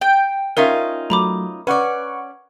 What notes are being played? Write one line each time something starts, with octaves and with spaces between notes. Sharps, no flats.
G5
C#4 D#4 F4 A#4 E5
F#3 A3 A#5 B5 D6
C#4 B4 D5 F#5 C#6